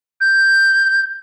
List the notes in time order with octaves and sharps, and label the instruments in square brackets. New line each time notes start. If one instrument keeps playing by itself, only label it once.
[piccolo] G6